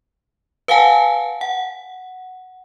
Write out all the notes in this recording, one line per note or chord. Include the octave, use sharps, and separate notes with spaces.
B4 F5 F#5 G#5 A5
F#5